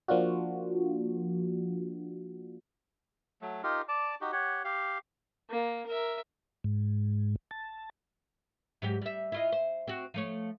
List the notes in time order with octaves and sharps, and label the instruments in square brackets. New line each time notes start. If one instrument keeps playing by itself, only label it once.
[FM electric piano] F3 A#3 D4 F4 F#4
[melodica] F#3 A3
D#4 F4 G4 A#4
D5 A5 D6
D#4 F#4 G4
G4 C#5 F#5
G4 F5
[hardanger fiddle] A#3
A#4 E5
[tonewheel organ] G#2
A5
[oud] G#2 F#3 G4
G3 E5
E4 F4 D#5
C5
C4 F#4
F3 A3 C#5